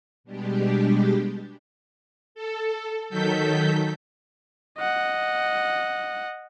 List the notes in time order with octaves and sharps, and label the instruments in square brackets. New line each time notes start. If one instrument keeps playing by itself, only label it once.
[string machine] B2 G3 G#3 D4 G4
A4
D#3 F#3 A4 G6 B6
[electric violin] D#5 F#5